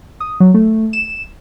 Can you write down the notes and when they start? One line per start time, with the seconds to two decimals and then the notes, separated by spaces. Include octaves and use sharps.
0.20 D#6
0.40 F#3
0.54 A3
0.93 E7